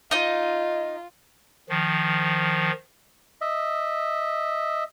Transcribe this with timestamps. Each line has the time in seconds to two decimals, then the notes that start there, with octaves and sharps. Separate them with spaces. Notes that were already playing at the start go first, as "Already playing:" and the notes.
0.11 D#4 F4 D#5
1.69 D#3 F3
3.41 D#5 E5